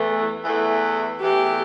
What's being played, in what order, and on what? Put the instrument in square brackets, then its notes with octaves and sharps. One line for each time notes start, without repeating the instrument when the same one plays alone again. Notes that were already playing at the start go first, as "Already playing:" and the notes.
Already playing: [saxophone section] E2 E3 A3
E2 E3 A3
[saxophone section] E2 E3 A3 [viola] G4